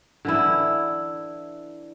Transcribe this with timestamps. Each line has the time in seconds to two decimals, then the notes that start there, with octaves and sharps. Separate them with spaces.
0.25 D3 E3 E4